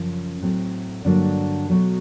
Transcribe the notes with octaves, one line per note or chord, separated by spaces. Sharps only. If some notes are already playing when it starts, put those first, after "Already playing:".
Already playing: F#2 C#3 F3
A2 F#3 A3 C4
G2 D3 F#3 A#3 D4
B2 F#3 A3